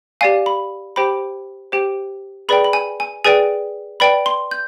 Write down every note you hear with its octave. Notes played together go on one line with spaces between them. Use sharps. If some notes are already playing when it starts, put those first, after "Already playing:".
G4 D5 F5 G#5
B5
G4 C5 G5 B5
G4 C5 G5
G#4 B4 D5 G5 B5
B5
G#5
G#5
G#4 B4 D5 G5 G#5
B4 D5 G5 B5
C6
G6